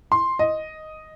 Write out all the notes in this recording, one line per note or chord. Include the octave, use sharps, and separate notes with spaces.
C6
D#5